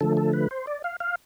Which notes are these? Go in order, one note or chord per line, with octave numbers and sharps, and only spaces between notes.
D3 F3 A3 A4
A4
B4
C5
D5
F5
F5